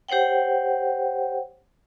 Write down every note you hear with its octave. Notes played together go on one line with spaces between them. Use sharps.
G4 C5 C#5 F#5 G5